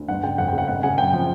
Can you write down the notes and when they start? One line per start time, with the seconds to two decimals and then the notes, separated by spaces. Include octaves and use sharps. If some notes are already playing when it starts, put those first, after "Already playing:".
Already playing: D2
0.08 G1 F#5
0.23 C#3 G5
0.38 F2 F#5
0.48 G5
0.53 C#3
0.58 F#5
0.68 G#1 F#5
0.83 C#3 F#5 G#5
0.98 F#2 G5
1.13 F3